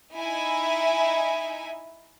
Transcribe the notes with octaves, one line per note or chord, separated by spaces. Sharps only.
D#4 E4 E5 G#5